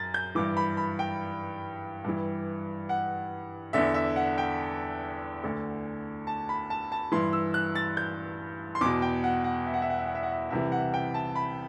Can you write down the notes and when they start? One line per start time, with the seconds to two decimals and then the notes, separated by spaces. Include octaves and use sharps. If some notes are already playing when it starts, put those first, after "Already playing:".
Already playing: F#2 A6
0.14 G6
0.35 G2 E3 D6
0.57 B5
0.77 B5
0.99 G5
2.04 G2 E3
2.89 F#5
3.73 E2 D3 E5
3.94 E5
4.16 F#5
4.38 G5
5.44 D2 D3
6.27 A5
6.49 B5
6.70 A5
6.92 A5
7.12 G2 E3 C6
7.33 E6
7.54 F#6
7.75 A6
7.97 G6
8.75 C6
8.81 E2 B2 D6
9.02 G5
9.24 F#5
9.44 F#5
9.67 E5
9.74 F#5
9.82 E5
9.90 F#5
9.98 E5
10.06 F#5
10.15 E5
10.23 F#5
10.32 E5
10.50 C2 C3 E3 E5
10.72 F#5
10.94 G5
11.14 A5
11.36 B5